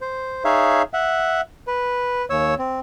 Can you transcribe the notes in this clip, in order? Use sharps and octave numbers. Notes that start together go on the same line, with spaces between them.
C5
D#4 G#4 C#5 E5 F5
E5 F#5
B4
D#2 C#5 E6
C4